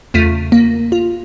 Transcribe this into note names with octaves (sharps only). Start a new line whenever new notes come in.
E2 C#3 A3 F4 B6 D#7
A#3
F4